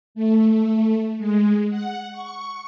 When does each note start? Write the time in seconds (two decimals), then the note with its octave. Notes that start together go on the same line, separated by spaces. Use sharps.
0.15 A3
1.18 G#3
1.70 F#5
2.12 C#6